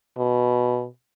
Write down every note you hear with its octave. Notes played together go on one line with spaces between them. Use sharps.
B2